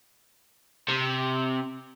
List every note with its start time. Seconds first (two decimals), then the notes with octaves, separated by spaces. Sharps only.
0.89 C3